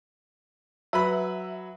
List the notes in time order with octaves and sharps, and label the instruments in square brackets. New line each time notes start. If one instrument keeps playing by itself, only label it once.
[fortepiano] F#3 B4 B5 [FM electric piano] E5